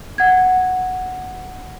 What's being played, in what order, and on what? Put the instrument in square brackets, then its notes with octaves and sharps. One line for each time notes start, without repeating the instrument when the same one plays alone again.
[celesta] F#5 G#6